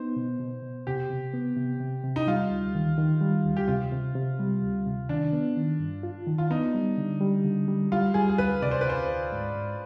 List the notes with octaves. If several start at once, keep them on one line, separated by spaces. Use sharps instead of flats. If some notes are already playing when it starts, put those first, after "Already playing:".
Already playing: B3 D#4 C5
B2
B2
B2
C3 G4
C3
B3
C3
C3
C3
D#4
G3 F4
D2
D#3
D#3
G3
D2
G4
C3 F4
C3
C3
G3
D2
C3
D#3 D4
B3
D#3
G2
F4
D#3
F4
B3 D#4
G3
D3
G3
D3
G3
G3 F4
G3 G#4
G#4
D2 B4
C3 D5
C5
B4
D2 C5
D2
G#2
G#2